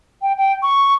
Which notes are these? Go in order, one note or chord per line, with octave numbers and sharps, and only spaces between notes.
G5
G5
C#6